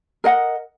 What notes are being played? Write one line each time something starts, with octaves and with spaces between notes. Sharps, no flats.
A#4 D#5 F#5